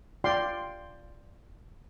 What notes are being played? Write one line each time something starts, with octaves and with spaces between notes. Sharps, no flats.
F4 D5 F5 G5 C6